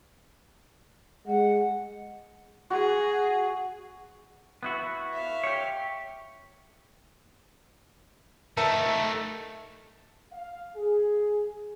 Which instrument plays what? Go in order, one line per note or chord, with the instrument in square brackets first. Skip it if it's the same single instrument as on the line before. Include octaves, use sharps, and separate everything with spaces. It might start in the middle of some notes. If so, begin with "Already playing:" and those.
[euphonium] G#3 [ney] F#5
[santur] F#4 [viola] G#4
[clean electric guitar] B3 E4 F#4
[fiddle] E5 F5
[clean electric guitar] G4 C#5
[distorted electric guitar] A3 D#4 [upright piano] A#4 E5 A5
[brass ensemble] F5
G#4